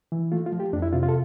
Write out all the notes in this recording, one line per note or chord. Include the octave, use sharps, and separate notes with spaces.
E3
A3 F4
F4
F3
G4
F2 D4
E4
C3 F4
F4
A4